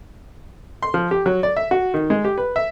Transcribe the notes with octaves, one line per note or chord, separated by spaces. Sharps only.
C6
F3
G4
F#3
D5
E5
F#4
D#3
G#3
G4
B4
E5